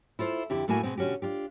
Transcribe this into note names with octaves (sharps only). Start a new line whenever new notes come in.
E4 F4 A4 C5
F2 D3 C4 E4 G4
A2 A3 A#3 E4 F#4 G#5
B2 G#3 B3 C4
B2 D3 C#4 F#4 G4
D4 F4 G4